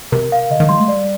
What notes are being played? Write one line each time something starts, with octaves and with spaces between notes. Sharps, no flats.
C3 A#4
F5
D3 D#5
D#3
G3 C6
A3
G3 D5